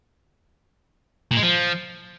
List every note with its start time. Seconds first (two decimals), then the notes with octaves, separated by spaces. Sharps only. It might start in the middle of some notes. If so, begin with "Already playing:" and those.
1.31 A#2
1.37 G#3
1.43 F3